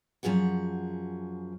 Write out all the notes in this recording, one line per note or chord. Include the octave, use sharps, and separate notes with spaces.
F#2 D#3 F3 G#4 F#5